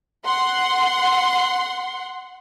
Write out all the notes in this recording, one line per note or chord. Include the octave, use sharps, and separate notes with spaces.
F#5 C6